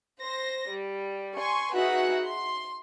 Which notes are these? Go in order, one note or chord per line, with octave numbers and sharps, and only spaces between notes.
C5 A#6
G3
G#5 C6 C#6
D#4 F#4 G#4 B4 E5 F#5
C6